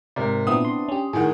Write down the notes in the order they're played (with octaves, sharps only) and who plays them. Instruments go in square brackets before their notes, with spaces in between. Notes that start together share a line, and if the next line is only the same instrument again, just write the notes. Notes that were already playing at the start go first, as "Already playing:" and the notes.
[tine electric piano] G#2 A#4 D5 [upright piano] C3
[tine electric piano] A#2 [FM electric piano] B3 C4 E4 [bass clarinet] D4 [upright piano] D#6
[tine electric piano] C6
[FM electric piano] C#4 G4
[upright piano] A2 D#3 [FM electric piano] G#4 F#5